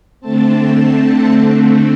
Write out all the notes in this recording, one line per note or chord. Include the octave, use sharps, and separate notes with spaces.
D3 A3 C4 A5